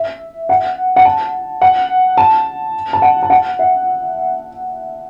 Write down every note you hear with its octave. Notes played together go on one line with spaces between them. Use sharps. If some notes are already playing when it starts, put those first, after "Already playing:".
Already playing: E5
F#5
F#5
A5
F#5
A5
A5
F#5
A5
F#5
E5